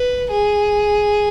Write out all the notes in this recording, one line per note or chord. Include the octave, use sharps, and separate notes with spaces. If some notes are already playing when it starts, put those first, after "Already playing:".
Already playing: B4
G#4